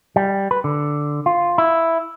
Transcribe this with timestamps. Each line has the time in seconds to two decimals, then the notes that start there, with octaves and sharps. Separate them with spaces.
0.16 G3
0.51 B4
0.64 D3
1.26 F4
1.58 E4